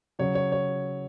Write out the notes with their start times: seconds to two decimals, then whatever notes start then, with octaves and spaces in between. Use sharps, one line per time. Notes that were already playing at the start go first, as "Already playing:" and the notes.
0.19 C#3 F#3 C#5
0.35 C#5
0.52 C#5